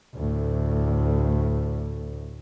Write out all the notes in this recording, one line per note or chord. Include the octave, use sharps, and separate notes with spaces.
D2 A2